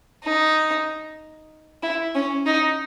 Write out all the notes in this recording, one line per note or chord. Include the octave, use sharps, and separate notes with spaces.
D#4
E4
C#4
D#4